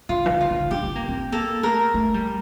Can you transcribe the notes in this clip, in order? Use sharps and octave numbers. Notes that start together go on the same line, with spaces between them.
D3 F4
E3
D3
F4
D3
D4 G4
C4
A#3
C4
A#3 A4
A3 A#4
A3
G3